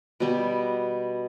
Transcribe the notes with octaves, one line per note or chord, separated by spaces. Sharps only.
B2 G3 B3